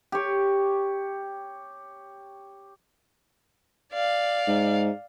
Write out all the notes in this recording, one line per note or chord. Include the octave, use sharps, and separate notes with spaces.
G4 C#5
D5 F5
G#2